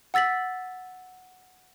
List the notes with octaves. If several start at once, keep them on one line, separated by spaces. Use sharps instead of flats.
F#5 E6 A6 B6 F#7